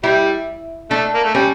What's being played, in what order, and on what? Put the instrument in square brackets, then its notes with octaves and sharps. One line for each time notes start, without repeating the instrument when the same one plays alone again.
[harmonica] G3 [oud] E4
[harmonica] A3 [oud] D4
[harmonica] A#3
A3
[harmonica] G3 [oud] C#4